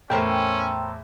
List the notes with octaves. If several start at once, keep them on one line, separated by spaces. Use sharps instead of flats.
E2 A2 A3 C#4 A4 A#4 C5 G5